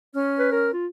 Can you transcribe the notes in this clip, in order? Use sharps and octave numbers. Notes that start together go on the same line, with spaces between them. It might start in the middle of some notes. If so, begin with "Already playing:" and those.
C#4 F6
B4
A#4
F4